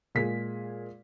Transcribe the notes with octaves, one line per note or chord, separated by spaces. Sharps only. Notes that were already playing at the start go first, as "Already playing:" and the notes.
A#2 G#3 G#4 B6